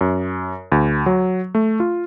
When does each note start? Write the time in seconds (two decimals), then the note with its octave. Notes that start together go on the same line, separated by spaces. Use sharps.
0.01 F#2
0.72 D2
1.06 F#3
1.55 A3
1.80 F4